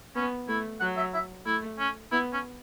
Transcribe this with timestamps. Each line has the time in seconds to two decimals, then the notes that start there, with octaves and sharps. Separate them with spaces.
0.15 B3 C#4
0.48 A3 E4
0.80 F#3 F#5
0.97 E5
1.14 E5
1.46 A3 E4
1.79 C#4
2.12 B3 E4
2.33 C#4